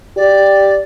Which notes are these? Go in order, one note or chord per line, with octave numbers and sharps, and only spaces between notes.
G4 D5